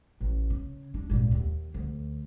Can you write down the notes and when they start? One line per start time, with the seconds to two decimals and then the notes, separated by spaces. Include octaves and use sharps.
0.20 A1
0.50 C#3
0.94 D4
1.10 G#1 A#2
1.31 D#2
1.74 D2